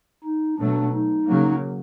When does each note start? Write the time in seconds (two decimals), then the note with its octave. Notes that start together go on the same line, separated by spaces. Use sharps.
0.24 D#4
0.59 B2 F#3 A3 D4
0.93 D#4
1.28 C#3 F#3 A#3